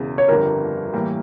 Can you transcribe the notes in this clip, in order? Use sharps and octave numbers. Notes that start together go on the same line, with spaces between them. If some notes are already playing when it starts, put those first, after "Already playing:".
Already playing: E1 E2 C#3
C#5
G1 F2 D3 G3 A#4
A2 E3 G3 A#3